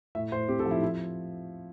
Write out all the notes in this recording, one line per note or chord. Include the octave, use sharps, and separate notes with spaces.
A2 E5
A2 C5
C4 G4
A4
F3
E4
E4